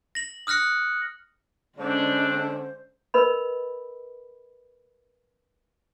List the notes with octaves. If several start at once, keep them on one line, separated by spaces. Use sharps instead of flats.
A#6 F#7
D#6 F6 F#6 A#6 C#7
D3 G#3 C#4 D4 C5
A#4 B4 D#5 B5